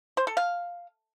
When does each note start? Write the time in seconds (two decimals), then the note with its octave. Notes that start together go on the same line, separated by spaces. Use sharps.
0.17 C5
0.27 A4
0.37 F5